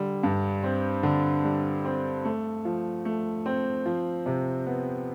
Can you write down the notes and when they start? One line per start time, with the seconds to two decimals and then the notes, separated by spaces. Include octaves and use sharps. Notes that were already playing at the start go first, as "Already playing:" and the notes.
Already playing: D3 G3
0.23 G2
0.63 C4
1.03 D3
1.44 G3
1.85 C4
2.25 A3
2.65 F3
3.05 A3
3.46 C4
3.86 F3
4.26 C3
4.66 B3